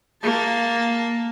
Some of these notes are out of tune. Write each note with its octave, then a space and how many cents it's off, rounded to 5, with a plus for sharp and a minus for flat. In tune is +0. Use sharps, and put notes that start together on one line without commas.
A#3 +0 A5 +0